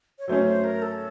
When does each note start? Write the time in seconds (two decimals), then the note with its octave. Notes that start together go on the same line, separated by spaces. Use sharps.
0.19 C#5
0.28 F#3 A3 C#4 C5
0.45 C5
0.64 A#4
0.82 A4